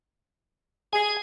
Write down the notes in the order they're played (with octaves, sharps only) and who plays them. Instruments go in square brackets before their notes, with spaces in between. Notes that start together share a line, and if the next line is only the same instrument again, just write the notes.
[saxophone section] G#4 [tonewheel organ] G#5